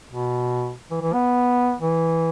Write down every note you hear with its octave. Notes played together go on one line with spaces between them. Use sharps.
B2
E3
E3
B3
E3